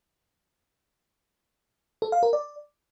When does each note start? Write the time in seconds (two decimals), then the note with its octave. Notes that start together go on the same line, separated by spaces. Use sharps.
2.02 A4
2.12 F5
2.23 A#4
2.33 D5